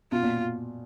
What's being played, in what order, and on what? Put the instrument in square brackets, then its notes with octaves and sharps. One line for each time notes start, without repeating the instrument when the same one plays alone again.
[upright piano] B2 [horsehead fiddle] F4
[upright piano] A#2